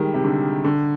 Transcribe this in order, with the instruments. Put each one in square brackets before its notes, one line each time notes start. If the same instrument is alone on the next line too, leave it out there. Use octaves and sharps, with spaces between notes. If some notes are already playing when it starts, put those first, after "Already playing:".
Already playing: [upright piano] D#3 G3 G#3 A#3
C3
D3
D3